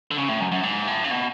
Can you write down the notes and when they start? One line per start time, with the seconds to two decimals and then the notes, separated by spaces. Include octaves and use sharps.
0.11 D3
0.17 C#3
0.28 A2
0.41 F#2
0.52 F#2
0.63 G#2
0.87 A2
1.04 C#3
1.11 B2